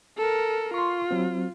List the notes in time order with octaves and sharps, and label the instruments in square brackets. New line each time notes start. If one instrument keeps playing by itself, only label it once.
[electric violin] A4 A#4
[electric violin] F4 [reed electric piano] C6 C#6
[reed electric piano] F#3 C4